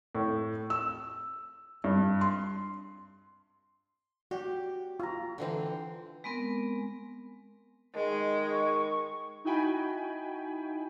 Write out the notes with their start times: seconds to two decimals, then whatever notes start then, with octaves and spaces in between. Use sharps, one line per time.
0.15 A2
0.70 E6
1.84 G2
2.21 C6
4.31 F#4 G4 D5
5.00 F4 A#5
5.38 D3 E3 C4
6.24 G#3 B3 C4 A#4
7.95 D#3 G#3
8.52 C#6
9.45 D#4 E4 F#4 G5 G#5 B5